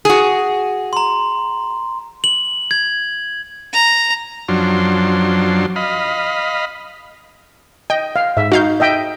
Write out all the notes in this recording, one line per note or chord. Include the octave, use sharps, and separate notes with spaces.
F#4 G#4
A#5 C6
F#7
G#6
A#5
F#2 F3 F#3 D4 C6
D#5 F5 B5
D#5 G5
F5
G#2 E5
D#4 F#4 F5 G6
D#5 E5 G5